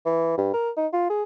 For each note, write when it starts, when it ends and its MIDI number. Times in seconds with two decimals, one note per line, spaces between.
0.06 0.34 52
0.38 0.49 43
0.54 0.70 70
0.77 0.87 63
0.93 1.08 65
1.10 1.23 68